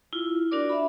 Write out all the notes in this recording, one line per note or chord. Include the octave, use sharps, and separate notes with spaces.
E4 F4
D4 F#4 A#4 D5 D6
E5 B5